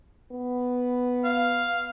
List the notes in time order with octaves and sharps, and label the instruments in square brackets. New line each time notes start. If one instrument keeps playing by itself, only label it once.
[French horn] B3
[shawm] F5